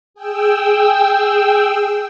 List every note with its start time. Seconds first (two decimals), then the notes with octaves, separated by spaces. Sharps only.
0.14 G#4 G5 E6